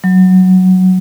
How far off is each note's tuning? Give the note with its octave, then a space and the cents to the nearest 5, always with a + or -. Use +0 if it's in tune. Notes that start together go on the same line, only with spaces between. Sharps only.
F#3 +5